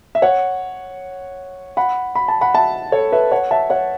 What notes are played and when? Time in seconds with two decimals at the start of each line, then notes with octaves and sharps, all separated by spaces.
0.15 E5
0.22 C#5 F#5
1.77 F#5 B5
2.15 B5
2.28 A5
2.41 F#5 B5
2.54 E5 A5
2.92 A4 C#5
3.12 B4 E5
3.31 C#5 F#5
3.51 E5 A5
3.70 C#5 F#5